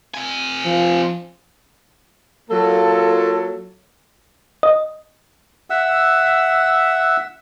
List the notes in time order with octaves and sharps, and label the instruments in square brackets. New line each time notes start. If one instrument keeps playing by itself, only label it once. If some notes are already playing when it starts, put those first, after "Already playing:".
[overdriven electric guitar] C3 G#5
[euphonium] F3
[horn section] F#3 A#3 F4 A4
[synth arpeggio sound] D#5
[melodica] E5 F#5 E6